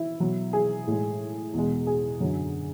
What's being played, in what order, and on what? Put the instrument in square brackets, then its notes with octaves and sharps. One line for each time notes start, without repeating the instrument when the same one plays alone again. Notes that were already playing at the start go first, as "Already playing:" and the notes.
Already playing: [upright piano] E4
B2 F#3
G#4
A2 G#3
E2 B2 G#3
G#4
F#2 D3 F#3